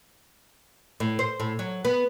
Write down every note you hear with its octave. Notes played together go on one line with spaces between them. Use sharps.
A2
C5
A2
F#3
B3